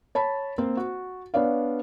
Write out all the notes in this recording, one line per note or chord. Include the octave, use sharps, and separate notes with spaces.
C#5 A5 B5
A#3 C4 C5
F#4
B3 D4 C#5 D5 F5